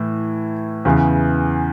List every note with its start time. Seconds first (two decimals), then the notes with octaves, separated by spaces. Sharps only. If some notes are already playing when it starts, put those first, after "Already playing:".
Already playing: A2 E3
0.85 E2 C#3 E3